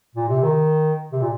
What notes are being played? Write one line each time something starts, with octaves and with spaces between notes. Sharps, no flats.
A#2
C3
D#3
C3
A#2